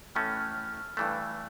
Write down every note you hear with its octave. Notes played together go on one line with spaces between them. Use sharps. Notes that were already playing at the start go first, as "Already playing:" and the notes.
A2 E3 A3 C#4 F6
F6
F#6
F6
F6
G2 E3 A3 E6